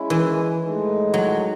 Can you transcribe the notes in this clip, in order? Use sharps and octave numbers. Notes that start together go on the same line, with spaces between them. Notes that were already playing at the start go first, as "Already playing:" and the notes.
Already playing: G#3 C#4 E4
E3
A2 G#3 D#4
F#3